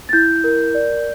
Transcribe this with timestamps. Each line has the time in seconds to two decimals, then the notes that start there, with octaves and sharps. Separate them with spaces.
0.09 A6
0.13 E4 G6
0.44 A#4
0.74 D5